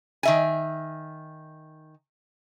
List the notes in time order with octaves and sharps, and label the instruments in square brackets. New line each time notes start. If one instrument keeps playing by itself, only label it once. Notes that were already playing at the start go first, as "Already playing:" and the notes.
[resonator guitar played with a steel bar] D#3 E5 G#5